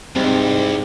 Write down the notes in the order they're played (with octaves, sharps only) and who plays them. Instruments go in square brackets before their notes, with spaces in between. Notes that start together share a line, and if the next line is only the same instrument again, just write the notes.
[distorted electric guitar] C2 [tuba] G#2 [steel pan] C4 D#5 [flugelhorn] G4